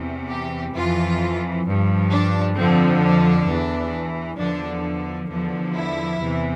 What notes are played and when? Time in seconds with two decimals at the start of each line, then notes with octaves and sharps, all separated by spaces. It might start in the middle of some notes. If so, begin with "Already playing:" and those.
Already playing: E2 C3 E3
0.28 G4
0.74 F2 E3 F4
1.64 G2 F3
2.09 D4
2.55 F2 D3 F3 C4
3.01 D4
3.46 E2 E3
4.36 E2 D3 F3 D4
5.29 E2 D3 F3
5.74 E4
6.19 E2 C3 E3